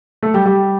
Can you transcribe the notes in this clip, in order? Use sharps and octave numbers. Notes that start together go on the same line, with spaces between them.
A3 A4
G3 G4
G3 G4